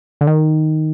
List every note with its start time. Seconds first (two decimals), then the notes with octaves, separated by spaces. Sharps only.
0.21 D3
0.27 D#3